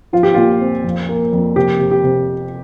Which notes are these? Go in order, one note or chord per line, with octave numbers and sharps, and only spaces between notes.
F3 F4
G4
A#2 F4
C4
F2
A#3
F2
C3 G4
C3
G4
C3